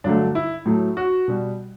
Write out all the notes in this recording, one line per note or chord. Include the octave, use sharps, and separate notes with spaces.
G2 D3 F#3 A3 D4
E4
A2 F#3 A3
F#4
B2 G3